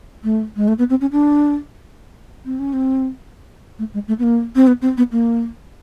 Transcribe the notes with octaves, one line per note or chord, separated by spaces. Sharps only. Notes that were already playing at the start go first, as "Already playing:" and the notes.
A3
G#3
A3
B3
C4
C#4
D4
C4
C#4
C4
A3
G#3
A3
B3
A#3
C4
B3
C4
B3
A#3